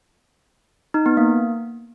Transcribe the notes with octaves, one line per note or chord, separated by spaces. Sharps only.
D#4
B3
A#3